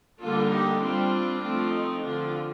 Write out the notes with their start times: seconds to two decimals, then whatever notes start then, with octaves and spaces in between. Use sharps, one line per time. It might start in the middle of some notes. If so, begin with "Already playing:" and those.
0.21 D3 G3 A#3 D4 F4 A4
0.51 D#4 G4
0.81 G3 C4 D4 F4
1.41 F3 A3 C4
1.72 D#4
2.02 D3 F3 C4 D4 F4